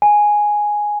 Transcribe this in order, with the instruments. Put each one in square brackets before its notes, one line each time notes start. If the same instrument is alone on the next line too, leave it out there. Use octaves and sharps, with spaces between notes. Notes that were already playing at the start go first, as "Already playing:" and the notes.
[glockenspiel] G#5